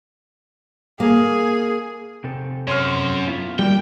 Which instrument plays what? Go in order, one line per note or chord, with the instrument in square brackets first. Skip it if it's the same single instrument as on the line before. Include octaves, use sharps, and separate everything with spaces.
[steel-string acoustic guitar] A#3 [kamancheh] G#4
[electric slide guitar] C3 C4 A4
[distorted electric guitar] F#2 [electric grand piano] C#5 C6 F6
[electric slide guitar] B3 E4 F4
[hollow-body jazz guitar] G3 [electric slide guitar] A3 A#3 [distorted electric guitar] G5